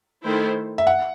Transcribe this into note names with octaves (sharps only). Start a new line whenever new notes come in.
D#3 A3 E4 A4 C5
E5
F#5